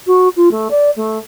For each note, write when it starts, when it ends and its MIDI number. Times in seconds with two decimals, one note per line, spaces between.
0.07 0.28 66
0.36 0.51 65
0.51 0.68 57
0.71 0.90 74
0.96 1.18 57